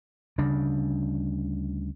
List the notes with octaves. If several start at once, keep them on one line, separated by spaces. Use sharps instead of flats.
D2 C#3 G3 D4